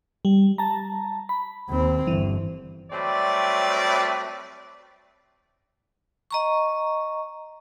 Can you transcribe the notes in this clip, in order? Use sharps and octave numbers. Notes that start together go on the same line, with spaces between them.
G3
A5 A#5
B5
D#2 C4
G1 E3
F#3 G3 A3 C4 B4 D5
D#5 A#5 C#6